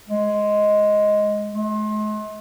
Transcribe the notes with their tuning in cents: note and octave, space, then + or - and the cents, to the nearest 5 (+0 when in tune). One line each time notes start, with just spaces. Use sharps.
G#3 +5
G#3 +45